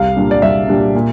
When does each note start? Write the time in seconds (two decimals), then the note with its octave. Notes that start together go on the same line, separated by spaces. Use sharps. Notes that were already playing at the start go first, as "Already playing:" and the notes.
Already playing: C2 F5
0.16 A#2 G3 D4
0.31 D5
0.42 C2 E5
0.68 A#2 G3 D4
0.95 A#2